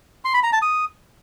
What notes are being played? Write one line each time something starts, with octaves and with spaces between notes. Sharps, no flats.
C6
B5
A#5
A5
D#6